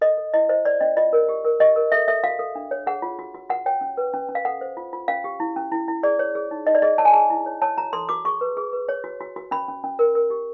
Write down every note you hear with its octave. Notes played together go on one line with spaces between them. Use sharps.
A4 D#5
A4
E4 D#5
C5 D#5
C#5 D5
C#4 D#5
F4 D#5
A#4
G4
A#4
G4 D#5
A#4
A4 E5
A4 E5
F#4 F5
A4
D4
C#5
G#4 F#5
F4
F#4
F#4
F#4 F#5
C#5 G5
C#4
B4
C#4
C#4
F5
A4 F#5
C5
F4
F4
C#4 F5
G4
E4
C#4
E4
E4
G#4 D5
C#5
G#4
D#4
D#4 D#5
D5
G#4 D#5
C#5 A5
G#5
G#4 A5
E4
C#5
C#5 A5
F#4 A#5
A4 C6
F#4 D6
G#4 C#6
B4
G#4
B4
C#5
F#4
F#4
F#4
C#4 B5
C#4
C#4
A#4
A#4
G4